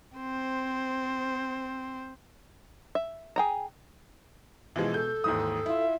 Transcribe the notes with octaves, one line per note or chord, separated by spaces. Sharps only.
C4 C5
E5
G#4 G5 A#5
B2 E3 F3 G#3
A4 G6
D#2 G#2 E3 D#6
E4 F4 E5